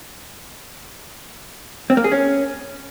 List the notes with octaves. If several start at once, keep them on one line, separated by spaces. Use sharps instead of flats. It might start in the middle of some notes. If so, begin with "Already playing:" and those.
C4
A#3
G#4
C#4